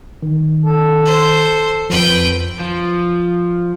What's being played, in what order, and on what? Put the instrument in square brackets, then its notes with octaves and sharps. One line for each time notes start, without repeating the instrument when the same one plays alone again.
[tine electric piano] D#3
[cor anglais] A4
[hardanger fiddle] C5
[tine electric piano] F2 F3 [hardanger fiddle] B4 G5
[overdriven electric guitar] F3